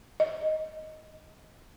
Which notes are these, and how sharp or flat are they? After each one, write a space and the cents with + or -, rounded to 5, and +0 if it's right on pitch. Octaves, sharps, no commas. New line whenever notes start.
D#5 +10